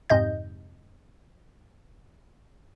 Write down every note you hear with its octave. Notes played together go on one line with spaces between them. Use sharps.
F2 G#2 C3 D#5 G6